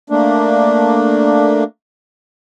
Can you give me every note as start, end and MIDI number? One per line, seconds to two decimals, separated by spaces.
0.10 1.64 57
0.10 1.64 58
0.10 1.64 62